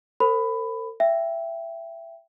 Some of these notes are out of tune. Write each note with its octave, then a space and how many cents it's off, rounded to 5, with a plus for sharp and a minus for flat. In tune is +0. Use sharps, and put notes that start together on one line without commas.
A4 +45 C5 +0 B5 +15
E5 +20 G5 +0